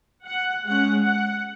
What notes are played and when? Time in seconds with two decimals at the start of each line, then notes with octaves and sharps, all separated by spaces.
0.26 F#5
0.66 G#3 C#4 F#5
1.06 F#5